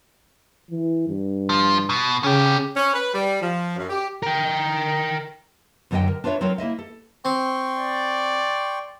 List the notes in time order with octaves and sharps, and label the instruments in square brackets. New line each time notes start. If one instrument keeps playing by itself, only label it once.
[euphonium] E3
G2
[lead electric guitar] F3
B2
[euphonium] C#3 [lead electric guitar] C#4 G4
[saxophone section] C#4
B4
G3
F3
F#2
G4
[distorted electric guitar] A#4 G5
[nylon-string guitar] F#2 D3 F#3 F#4 D#5 G5
A#4
D4 F4 B4 C#5 E5
F#3 C4 F4 A#4 C#5
A#3 E4 D#5 E5
A4
[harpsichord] C4 [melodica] G5 C6 C#6
[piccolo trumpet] D5